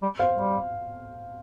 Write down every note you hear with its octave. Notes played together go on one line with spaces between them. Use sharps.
G3
C5 F5
G3